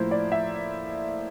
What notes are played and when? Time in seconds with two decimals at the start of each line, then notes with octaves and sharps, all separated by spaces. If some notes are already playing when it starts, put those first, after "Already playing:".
Already playing: A2 F3 A#3 E4 C5
0.11 D5
0.32 E5